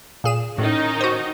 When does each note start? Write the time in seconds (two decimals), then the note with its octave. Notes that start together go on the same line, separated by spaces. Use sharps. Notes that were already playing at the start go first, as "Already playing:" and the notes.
0.24 A#2 G#4 E7
0.58 A2 D#3 C#4 D#4
1.01 F#4 C5